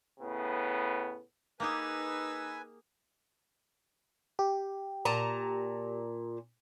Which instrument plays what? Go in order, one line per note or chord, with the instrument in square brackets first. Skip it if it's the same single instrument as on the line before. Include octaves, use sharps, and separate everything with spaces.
[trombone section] A2 C#3 B3
[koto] A#3 G4 G#4 [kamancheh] D#4 E6 [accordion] B4 G#5
[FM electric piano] G4
[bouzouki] A#2 A5 A#5